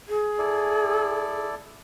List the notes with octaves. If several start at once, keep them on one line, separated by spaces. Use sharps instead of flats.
G#4
E4 A4 D5